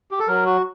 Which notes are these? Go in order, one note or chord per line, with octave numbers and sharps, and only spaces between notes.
G4
A4
F#3 A#4
F#4